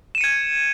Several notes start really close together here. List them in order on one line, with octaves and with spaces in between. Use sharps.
E7 D#7 C#7 G#6